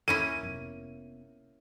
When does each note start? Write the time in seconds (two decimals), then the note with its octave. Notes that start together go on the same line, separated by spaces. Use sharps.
0.08 D#2 A#3 C#4 E4 D#7
0.43 F1 B3